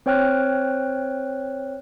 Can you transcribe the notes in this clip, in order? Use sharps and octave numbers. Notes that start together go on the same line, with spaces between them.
C4 C5 C#5 G5 F6 F#6